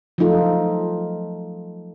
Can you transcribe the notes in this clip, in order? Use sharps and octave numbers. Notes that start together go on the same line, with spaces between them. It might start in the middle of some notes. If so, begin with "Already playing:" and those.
F3 F#3 A3 D#4 F4 A4